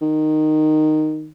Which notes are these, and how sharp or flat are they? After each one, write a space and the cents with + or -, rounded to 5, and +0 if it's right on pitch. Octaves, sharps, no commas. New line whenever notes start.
D#3 -10